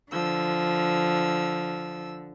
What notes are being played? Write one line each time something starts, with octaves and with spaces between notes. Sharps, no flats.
D3 F3 E6